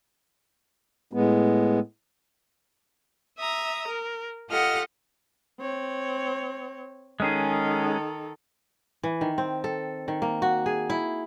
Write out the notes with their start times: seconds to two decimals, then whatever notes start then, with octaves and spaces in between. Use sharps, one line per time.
1.13 A2 G#3 B3
3.39 E5 A#5 D#6
3.87 A#4
4.50 F4 G4 A4 D#5 F#5 F6
5.60 C4 C#5
7.20 D#3 G#3 C#4 G#4 A4
9.03 E3
9.21 D#3
9.38 C4
9.64 A4
10.08 D#3
10.22 A#3
10.42 F#4
10.66 G#4
10.90 E4